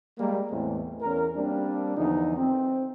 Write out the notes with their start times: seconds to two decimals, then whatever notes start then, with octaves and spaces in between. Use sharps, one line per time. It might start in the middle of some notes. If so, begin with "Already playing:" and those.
0.18 G3 G#3 A#3
0.50 E2 A2 G#3 A3 C4
1.02 E2 C#4 A#4
1.35 G3 A#3 C4 D4
1.96 E2 D3 F3 D#4
2.36 C4